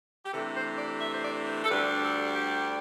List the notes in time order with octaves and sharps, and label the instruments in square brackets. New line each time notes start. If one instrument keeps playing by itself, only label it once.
[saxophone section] G4
C3 E3 A3 D4 A4
C5
D5
E5
C5
D5
C5
A4
D2 D3 G3 D4 B4
A4
G4